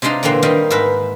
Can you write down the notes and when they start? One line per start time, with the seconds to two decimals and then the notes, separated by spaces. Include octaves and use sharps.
0.02 C3 G#3 D4 D#4 F4
0.23 A#2 D3 E3 A#3 C4
0.42 D#3 G3 C4 D#4 A#4
0.70 G#2 A#4 B4 E5